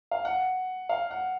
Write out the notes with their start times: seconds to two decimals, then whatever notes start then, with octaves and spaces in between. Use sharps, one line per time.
0.11 F5
0.25 F#5
0.89 F5
1.11 F#5